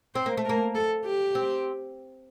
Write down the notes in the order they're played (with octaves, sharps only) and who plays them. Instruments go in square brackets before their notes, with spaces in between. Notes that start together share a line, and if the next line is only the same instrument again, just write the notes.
[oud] C4 [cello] C5
[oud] A#3
A3
[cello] A#4
[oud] A#3
[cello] A4
G4
[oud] C4